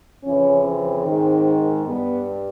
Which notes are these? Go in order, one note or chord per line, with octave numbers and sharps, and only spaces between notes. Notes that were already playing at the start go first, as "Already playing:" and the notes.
F2 C#3 E3 C#4
C4
G#2 D#3
G2 B3